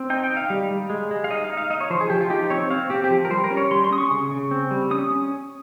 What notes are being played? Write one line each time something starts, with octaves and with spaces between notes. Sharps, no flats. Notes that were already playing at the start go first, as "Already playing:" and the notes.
Already playing: C4
D#4 G5
G5
D#4
F5
G3
G3
G#3
G#3
F5
D#4 D#5
F5
D#4
F5
D#4 D#5
C#5
F3 C5
G#4
F3 G4
F4
D#4 G4
C4 C#5
C4 F5
C4 G4
G4
F3
A#4
G3 C5
A#4
C#4
C#5
G3 C6
C6
C#4 D#6
C#6
C#3
C#3
C4
G3
C#4 D#6
C#4